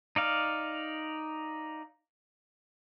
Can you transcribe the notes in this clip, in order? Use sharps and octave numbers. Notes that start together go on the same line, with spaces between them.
D#4 D5 F5